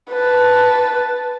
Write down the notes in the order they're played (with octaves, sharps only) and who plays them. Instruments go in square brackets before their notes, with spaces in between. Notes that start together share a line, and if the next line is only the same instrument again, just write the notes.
[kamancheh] B4 A5